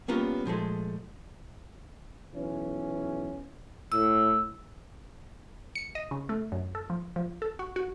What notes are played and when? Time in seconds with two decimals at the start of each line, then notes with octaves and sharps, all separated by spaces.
0.08 G3 A#3 B3 C#4 F4
0.45 A#2 F3 G#3 A3
2.33 B1 E3 C#4
3.92 A2 E6
5.75 C#7
5.95 D#5
6.11 C#3
6.29 A3
6.52 F#2
6.75 A4
6.90 F3
7.16 F3
7.42 A4
7.59 F#4
7.76 F#4